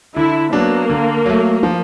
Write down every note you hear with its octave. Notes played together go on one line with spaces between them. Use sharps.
D3 E4
F#3 A#3 B3 D4
D3
F#3 A3
F3